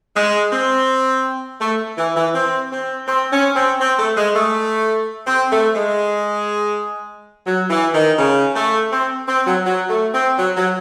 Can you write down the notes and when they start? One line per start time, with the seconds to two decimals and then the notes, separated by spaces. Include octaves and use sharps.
0.16 G#3
0.52 C4
1.61 A3
1.98 E3
2.16 E3
2.34 C4
2.71 C4
3.07 C4
3.32 C#4
3.55 C4
3.81 C4
3.99 A3
4.17 G#3
4.35 A3
5.27 C4
5.51 A3
5.75 G#3
7.46 F#3
7.70 E3
7.94 D#3
8.18 C#3
8.55 A3
8.92 C4
9.28 C4
9.47 F#3
9.65 F#3
9.89 A3
10.13 C4
10.37 F#3
10.56 F#3